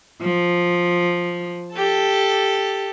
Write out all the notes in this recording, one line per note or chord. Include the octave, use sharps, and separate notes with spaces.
F3
G4 A4 A5